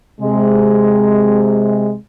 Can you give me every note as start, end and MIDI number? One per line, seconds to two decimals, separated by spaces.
0.21 1.95 48
0.21 1.95 56